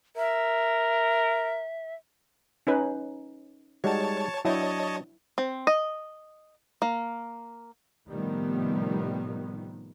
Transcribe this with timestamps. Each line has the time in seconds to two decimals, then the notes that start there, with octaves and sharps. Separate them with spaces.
0.16 A#4 E5
2.67 C#4 D#4 B4
3.84 G3 G#3 D#4 F#4 C#5 A5
4.45 F#3 D4 E4 C#5 D#5 G5 A5
5.38 C4
5.67 D#5
6.82 A#3
8.08 A2 C3 D#3 F3 G3 B3